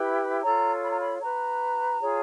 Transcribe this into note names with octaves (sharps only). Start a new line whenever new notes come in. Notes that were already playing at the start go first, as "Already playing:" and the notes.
Already playing: E4 G4 B4
F4 A4 C#5 A#5
B5
A#5
B5
F#4 B4 A#5
F4 G#4 C#5